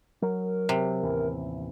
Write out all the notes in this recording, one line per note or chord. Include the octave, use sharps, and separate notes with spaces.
F#3 A#4
C3
A1 D#2 E3